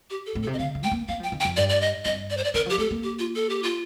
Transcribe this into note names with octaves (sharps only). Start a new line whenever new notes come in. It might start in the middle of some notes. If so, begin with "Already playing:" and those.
G4
A4
A2
A4
C3
D#5
D3 F5
D3
A3 G5
A#3
A#3 F5
F3
G5
D#3
G5
F2
G2 D5
D5
D#5
G2 D#5
D5
C5
D5
D#3 A#4
F3
G4
A3 A4
A#3
G4
F4
A4
G4
F4